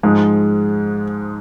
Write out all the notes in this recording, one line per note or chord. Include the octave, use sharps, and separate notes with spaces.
G#2 F3 G#3